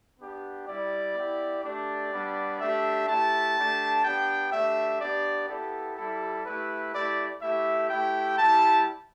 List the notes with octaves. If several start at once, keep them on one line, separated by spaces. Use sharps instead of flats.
B3 D4 G4
G3 E4 G4 D5
B3 E4 G4
A3 D4 G4 D5
G3 B3 D4
A3 D4 G4 E5
A3 E4 G4 A5
A3 D4 G4
B3 D4 G4 G5
A3 D4 G4 E5
B3 D4 G4 D5
B3 E4 G4 A4
G3 E4 G4 A4
A3 E4 G4 B4
A3 E4 G4 D5
A3 E4 G4 E5
A3 E4 G4 G5
G3 E4 G4 A5